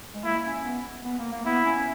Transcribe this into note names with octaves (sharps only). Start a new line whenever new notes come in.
G#3
A#3 E4
C#4
B3
B3
A#3
A#3
B3 E4
C#4